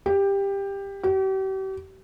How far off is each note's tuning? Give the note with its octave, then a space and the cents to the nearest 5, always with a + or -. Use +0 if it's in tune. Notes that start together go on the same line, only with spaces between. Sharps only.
G4 +15
G4 -40